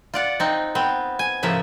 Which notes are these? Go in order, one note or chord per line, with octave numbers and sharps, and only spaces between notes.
F4 D5 F#5
C4 D#4
B3 C4
G#5
A2 C#3 F3 A#3 E5